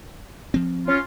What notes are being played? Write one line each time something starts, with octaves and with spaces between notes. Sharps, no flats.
F3 C4
C#4 F4